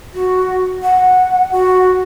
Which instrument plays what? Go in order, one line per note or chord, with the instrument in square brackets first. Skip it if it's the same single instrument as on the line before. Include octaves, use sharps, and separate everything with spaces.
[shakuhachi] F#4
F#5
F#4